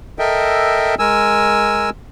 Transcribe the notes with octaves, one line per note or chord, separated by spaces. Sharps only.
A4 A#4 D#5 E5 G5
G#3 A#4 G#5 E6